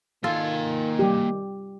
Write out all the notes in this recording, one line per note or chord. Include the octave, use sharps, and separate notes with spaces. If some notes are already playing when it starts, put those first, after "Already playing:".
D#3 A#3 F4 A4 G#5
G3 G4